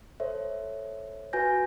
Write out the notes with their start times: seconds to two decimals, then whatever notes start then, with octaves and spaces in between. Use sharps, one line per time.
0.20 A4 C5 C#5 E5
1.33 F#4 B4 G#5 G6 A#6